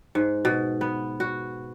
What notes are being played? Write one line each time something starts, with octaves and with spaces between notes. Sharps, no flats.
G#2
B2
B3
F#4